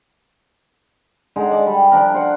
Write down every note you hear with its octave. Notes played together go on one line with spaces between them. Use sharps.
D3 G#3 D#4
D5 A5
G3
F3 D4 A#4
C5 F#5